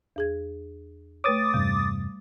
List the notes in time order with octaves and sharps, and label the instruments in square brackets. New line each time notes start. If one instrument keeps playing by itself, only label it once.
[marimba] E2 G#4 G#6
[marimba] A3 B4 C#5 [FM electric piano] D6 D#6 A6
[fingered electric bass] E2 G2 C3 [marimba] G3